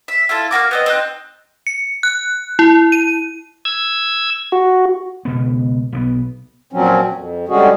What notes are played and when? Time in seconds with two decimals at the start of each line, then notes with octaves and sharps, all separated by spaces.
0.08 E5
0.29 E4 F4 A4
0.51 A#3 C#4 F#4 D6
0.71 B3 C4 D#5
0.86 C4 D#4 F#6
1.67 C#7
2.03 F#6
2.59 E4
2.92 D#7
3.65 E6 G#6
4.52 F#4
5.25 C#2 B2 B3
5.92 B1 E3 B3
6.73 A#2 F3 F#3 C4 C#4
7.13 F2
7.49 D3 G3 G#3 C#4 F#4 G#4